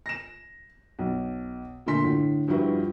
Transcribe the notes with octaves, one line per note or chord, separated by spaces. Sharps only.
A#6 E7
B1
A#2 D3 A3 C6 B6
A2 D3
G2 F3 G3 E4 F#4 B4